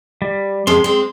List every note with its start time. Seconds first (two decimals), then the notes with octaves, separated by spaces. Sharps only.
0.22 G3
0.67 F2 C3 G#3 C6
0.84 G#3 C4